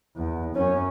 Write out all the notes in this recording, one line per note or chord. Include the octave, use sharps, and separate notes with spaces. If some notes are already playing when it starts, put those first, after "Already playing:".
E2
F#2 C#4